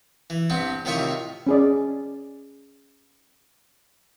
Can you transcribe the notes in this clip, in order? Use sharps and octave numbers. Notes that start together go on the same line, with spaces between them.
E3
G2 B3 C4
A2 C3 D#3 F4 E5 C#6
C#4 G#4 D5